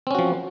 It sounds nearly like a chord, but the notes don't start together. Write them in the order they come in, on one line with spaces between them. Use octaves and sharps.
C4 C#4 F#4 F3